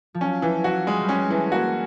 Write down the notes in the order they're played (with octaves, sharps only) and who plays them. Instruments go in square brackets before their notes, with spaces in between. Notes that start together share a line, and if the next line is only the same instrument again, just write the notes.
[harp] F3
[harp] F#3 [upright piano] C#4
[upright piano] E3 [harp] F3
[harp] F#3 [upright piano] F#4
[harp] G3 [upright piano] G#3
[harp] G3
[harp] G#3 [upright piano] C#4
[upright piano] E3 [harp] A3
[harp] A#3 [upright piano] F#4